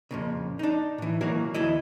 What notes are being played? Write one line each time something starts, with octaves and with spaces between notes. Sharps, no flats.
F2 A#2 C#3
D4 D#4
A2 E3
B2 E3 F#3 A#3 F#4
D2 E3 E4 D#5